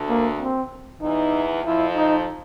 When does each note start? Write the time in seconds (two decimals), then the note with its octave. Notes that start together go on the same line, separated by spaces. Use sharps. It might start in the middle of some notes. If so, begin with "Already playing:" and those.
Already playing: D2 D3
0.10 A#3
0.41 C4
1.01 E2 E3 D#4
1.64 F2 F3 E4
1.95 D#4